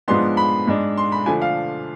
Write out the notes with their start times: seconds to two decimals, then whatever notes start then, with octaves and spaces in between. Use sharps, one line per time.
0.08 G#2 F3 G#3 B3 D4 C6
0.37 B5
0.67 G#2 G#3 D4
0.98 C6
1.12 B5
1.26 D3 F3 A3 D4 G#5
1.42 F5